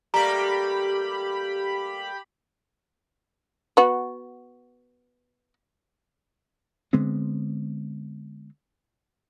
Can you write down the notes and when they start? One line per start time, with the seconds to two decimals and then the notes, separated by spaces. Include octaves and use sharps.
0.14 G3 A3 A#3 G4 A#5 B5
3.77 B3 F#4
6.93 D3 G#3 B3 C4